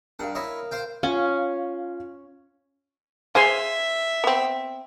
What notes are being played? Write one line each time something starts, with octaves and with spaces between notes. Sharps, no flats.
G2 A#4 F5 F#5
E4 C#5 D#5
C5 F5 G5
C#4 F4 F5
G#4 C5 E5 F5 G#5 C6
B3 C4